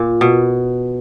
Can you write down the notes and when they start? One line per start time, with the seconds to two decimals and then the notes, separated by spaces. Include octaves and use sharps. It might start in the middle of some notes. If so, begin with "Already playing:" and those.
Already playing: A#2
0.21 B2